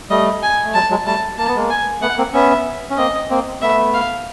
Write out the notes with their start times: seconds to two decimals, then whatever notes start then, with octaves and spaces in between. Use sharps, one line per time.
0.10 G3 A3 D#5
0.43 G#5
0.65 A3
0.74 F#3 G#3 A5
0.90 F#3 G#3
1.06 G3 A3 A5
1.38 A#3 A5
1.48 B3
1.56 G#3 A#3
1.71 G#5
2.01 A3 B3 F#5
2.17 A#3 C4
2.33 B3 C#4 E5
2.90 C#4
2.97 A#3 C4 D#5
3.30 A#3 C4
3.62 A3 B3 E5
3.94 F5